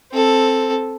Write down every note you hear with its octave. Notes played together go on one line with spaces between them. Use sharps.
C4 A4